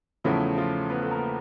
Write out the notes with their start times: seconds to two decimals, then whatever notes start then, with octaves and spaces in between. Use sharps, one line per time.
0.24 E2 C#3 F3 A3 C#4 E4
0.57 F3 F4
0.89 B3 B4
1.02 A4
1.11 A#3 A#4